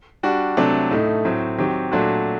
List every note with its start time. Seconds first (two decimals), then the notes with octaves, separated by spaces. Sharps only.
0.23 G3 D4 F#4
0.57 C3 F#3 A3 D4 A4
0.91 A2 A3 D#4
1.25 A2 F#3 C4
1.58 D#3 F#3 C4 G4
1.92 A#2 F#3 A3 D4 F#4